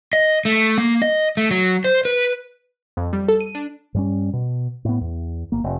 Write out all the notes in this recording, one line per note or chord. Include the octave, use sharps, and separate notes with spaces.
D#5
A3
A#3
D#5
A3
F#3
C5
B4
F2
G3
A4
D#7
D4
G2 G3 C#4
B2
A2 B3
E2
G1 A#3
F1